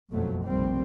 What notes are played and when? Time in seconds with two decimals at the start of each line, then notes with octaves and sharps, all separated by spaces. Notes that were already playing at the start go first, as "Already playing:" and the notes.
0.12 F#1 B1 F2 B2 F#3 A3
0.46 F1 A#1 D#2 G3 C4